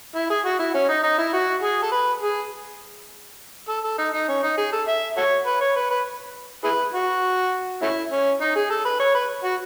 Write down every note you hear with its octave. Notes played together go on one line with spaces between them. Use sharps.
E4
G#4
F#4
E4
C#4
D#4
D#4
E4
F#4
G#4
A4
B4
G#4
A4
A4
D#4
D#4
C#4
D#4
G#4
A4
E5
F#4 A4 C#5
B4
C#5
B4
B4
E4 G#4 B4
F#4
A3 C#4 E4
C#4
D#4
G#4
A4
B4
C#5
B4
F#4